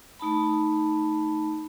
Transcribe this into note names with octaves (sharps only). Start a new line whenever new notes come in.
A3 D#4 A5 B5